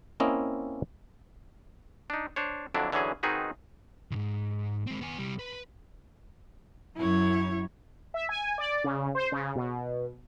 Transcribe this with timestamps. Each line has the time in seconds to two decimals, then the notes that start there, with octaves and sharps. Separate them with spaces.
0.20 A#3 C4 C#4 E4 D#5
2.10 D4 D#4
2.36 D4 C5 C#5
2.74 F2 D3 F#3 D4 E4
2.92 D3 E3 F#3 C#4 G#4
3.23 D#3 C4 D#4 F#4 G#4 B4
4.11 C2 G#2
4.87 G#3 C4
5.01 B3 G#5
5.18 C2 G3
5.39 B4
6.97 F#2 E4 C#5
8.14 E5
8.29 G#5
8.58 D5
8.84 C#3
9.15 C5
9.32 C#3
9.55 B2